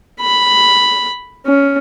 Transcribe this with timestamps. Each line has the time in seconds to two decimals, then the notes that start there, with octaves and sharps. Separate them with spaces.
0.20 B5
1.46 C#4